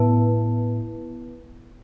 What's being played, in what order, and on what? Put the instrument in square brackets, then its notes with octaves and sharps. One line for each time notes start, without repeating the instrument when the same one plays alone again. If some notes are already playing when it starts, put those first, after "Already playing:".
Already playing: [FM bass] A2 [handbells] B3 E4 B4 A5